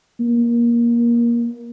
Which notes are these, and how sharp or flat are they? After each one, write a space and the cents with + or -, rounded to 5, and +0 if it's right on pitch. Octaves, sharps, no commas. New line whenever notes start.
A#3 +20